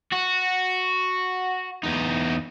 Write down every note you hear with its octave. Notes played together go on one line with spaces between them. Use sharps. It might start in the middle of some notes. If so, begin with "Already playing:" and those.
F#4
E2 D#4